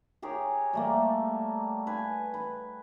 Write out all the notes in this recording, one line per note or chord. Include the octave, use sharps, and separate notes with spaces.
G4 G#4 A#4 C#5
G3 A3 A#3
B4 G#5
B4